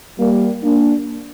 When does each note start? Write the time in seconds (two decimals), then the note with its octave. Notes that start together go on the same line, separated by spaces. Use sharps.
0.18 G3 A#3
0.62 A#3 D4